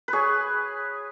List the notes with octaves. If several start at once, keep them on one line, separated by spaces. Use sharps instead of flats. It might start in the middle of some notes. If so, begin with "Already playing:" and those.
G#4 B4 C#5